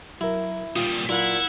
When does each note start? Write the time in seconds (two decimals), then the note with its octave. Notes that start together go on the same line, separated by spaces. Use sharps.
0.21 F#3 E4 A#4
0.76 A#2 G3 F4 D#6
1.09 A#2 F#3 E4 F4 F#5 B5 G#6